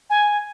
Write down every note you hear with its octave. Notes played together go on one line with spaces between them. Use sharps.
G#5